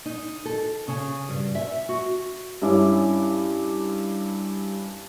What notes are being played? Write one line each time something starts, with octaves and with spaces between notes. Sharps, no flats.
D#4
A4
C#3
G2
E5
F#4
G2 C#4 E4 D6